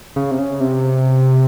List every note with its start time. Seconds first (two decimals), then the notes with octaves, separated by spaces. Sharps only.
0.16 C#3
0.31 C3
0.39 C#3
0.60 C3